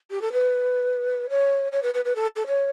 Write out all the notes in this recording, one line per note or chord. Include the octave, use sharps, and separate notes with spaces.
G4
A4
B4
C#5
C#5
B4
B4
B4
A4
A4
C#5